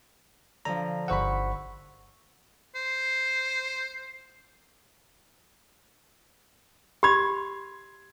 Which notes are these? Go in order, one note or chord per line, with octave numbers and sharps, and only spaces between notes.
D3 F3 A#5
G1 C5 F#5 B5 C#6 E6
C5
G4 B5 C6 G#6